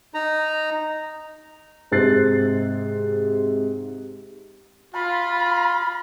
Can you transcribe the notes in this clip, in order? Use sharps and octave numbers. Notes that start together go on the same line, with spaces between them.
D#4 A#5
G#2 C3 C5 F#6 A6 C7
F4 B5